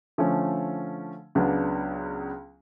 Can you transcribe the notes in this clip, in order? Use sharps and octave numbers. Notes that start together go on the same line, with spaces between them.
D3 F3 A3 C#4
C#2 C#3 F#3 B3 D4